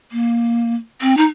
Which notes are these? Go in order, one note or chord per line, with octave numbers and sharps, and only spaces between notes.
A#3
C4
D#4